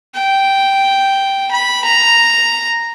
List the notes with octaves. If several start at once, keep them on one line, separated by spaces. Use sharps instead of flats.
G5
B5
A#5